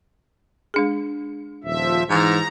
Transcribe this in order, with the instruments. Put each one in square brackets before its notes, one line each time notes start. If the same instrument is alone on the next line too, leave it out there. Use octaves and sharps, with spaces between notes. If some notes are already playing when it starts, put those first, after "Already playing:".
[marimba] G#3 D4 G#4
[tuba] D#1 [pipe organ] F3 E5
[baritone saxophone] G#2 [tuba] E3 [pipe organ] A#5